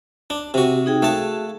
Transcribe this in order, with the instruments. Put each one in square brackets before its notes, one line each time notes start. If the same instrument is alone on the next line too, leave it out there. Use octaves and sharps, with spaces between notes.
[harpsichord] D4
C3 F#4
[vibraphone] D#4 G#4 G5
[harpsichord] A3 A5 [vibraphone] F#4 G#4 F5